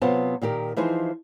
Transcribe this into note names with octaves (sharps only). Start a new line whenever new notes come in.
C3 F#3 B3 F4 C5 A5
A#2 D#3 G4 A#4
E3 F3 D#4 G#4 C5